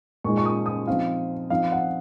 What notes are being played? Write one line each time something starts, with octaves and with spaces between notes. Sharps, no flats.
A#2 G#3 D#4 C#6
C#6
D#6
D#6
F3 C4 D#4 F5
F3 C4 D#4 F5
F#5